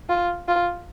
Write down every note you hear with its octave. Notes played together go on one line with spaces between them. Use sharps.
F4
F4